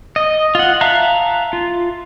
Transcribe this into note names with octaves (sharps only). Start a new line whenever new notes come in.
D#5
F4 F#5
E5 F5 A5 A#5 F#6
F4